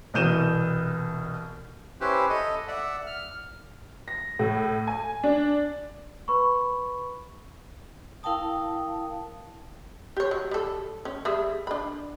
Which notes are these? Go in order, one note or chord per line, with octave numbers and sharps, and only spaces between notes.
C2 B2 E3 G6 D#7 E7
C#4 E4 G4 B4 C5
A4 D#5
D5 E5 F#5
F6
A#6
A2
G#5
D4
B4 B5 C#6
E4 A#4 F5 G5 A5 D#6
G4 C#5
F#3
G3 A4
C#4
G3 G#4 E5
D4 B5